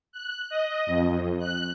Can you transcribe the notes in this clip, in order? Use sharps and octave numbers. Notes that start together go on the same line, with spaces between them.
F#6
D#5
F2
F#6